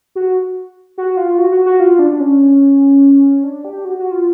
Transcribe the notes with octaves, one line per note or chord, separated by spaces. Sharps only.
F#4
F#4
F4
F#4
F#4
F#4
F4
D4
C#4
D4
G4
F#4
F#4
F4